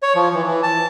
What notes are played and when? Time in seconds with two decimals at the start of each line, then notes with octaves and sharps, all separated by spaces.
0.03 C#5
0.15 F3
0.34 E3
0.46 E3
0.63 A5